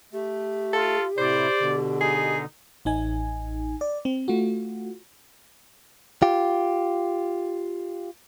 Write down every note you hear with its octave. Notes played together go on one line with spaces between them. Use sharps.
A3 G4
F4 A4
A2 C3 E4 C5 D5
B2 D3
D#4 G#4
A1 D#4 G#5
D5
C4
A3 F4 F#4
F4 G4